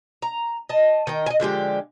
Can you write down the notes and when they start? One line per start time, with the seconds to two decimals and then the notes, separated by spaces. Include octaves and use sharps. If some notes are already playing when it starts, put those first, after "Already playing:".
0.22 A#5
0.69 D#5 A5
1.07 D#3 D#5 G5
1.26 D#5 G#5
1.40 D3 F3 G#3 G4